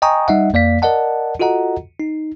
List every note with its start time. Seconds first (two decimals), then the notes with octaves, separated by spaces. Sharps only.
0.02 D#5 G5 G#5 A#5 C#6 D#6
0.28 G3 D#4 D#5 E5 F#5
0.53 F2 A#3 D5 F5 B6
0.82 A#4 D5 D#5 F#5 A5
1.40 F4 F#4 A4 D#5 F#5 A#5
1.99 D#4